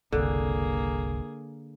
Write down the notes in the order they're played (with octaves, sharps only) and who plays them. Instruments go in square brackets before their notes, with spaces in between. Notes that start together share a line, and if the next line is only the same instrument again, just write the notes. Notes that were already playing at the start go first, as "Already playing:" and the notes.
[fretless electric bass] F#1 C2 [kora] D3 [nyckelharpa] A#3 G#4